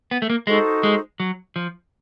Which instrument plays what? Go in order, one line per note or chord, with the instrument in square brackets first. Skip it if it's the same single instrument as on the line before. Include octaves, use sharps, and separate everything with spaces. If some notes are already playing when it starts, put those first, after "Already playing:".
[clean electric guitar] B3
A3
A#3
[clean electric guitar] G#3 [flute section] D#4 F#4 A4 C5
[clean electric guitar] G#3
F#3
F3